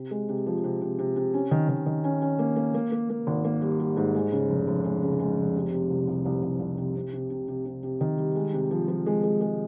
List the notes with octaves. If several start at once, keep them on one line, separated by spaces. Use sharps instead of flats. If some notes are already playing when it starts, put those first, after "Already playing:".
Already playing: C3
G#3
C3
F3
C3
C3
C3
C3
C#4
D#3
D#3
D#3
C#4
C#4
A#3
A#3
A#3
A#3
A#3
G#1
A#3
G3
G3
G#2
G#3
C#3
F1
F1
G#3
C#3
G#3
F1
C3
C3
C2
C2
C2
C2
C2
C3
C3
C3
C3
C3
C3
C3
D#3
G3
G#3
C3
F3
F3
G#3
G#3
G#3